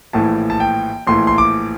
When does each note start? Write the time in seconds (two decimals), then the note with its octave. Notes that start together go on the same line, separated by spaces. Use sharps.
0.13 A#1 A2 E3 A5
0.50 A5
0.60 G5
1.07 A#1 A2 E3 C6
1.27 C6
1.38 D6